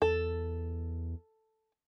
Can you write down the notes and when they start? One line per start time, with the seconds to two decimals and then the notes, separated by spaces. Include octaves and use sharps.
0.02 E2 A4